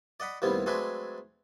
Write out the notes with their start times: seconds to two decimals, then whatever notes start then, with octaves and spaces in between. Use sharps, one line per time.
0.20 D5 D#5 F#5 B5
0.42 D#2 A2 C3 G3 B3 C4
0.66 F#3 G#3 A3 C4 D4 B4